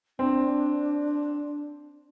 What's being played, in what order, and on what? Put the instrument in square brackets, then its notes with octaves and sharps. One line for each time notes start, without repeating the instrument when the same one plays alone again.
[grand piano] C4 [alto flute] D4